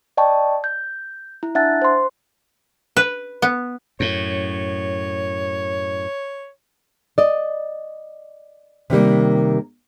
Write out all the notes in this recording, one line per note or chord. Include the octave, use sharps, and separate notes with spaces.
D5 D#5 G5 A5 C#6
G6
E4
D4 E5 F#5 A5 F#6 A6
C5 C6
B4
B3
F#2 A2 C#5
D5 D#5
C3 D#3 G3 A#3